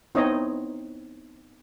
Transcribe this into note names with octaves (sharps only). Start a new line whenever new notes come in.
B3 C4 D#4 E4 C#5 D#5